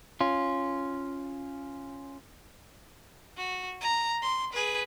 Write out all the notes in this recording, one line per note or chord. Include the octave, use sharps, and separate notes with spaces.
C#4 F4
F#4
A#5
C6
G#4 B4